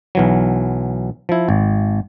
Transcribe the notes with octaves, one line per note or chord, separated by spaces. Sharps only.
B1 E3 F#3
F3 E4
G#1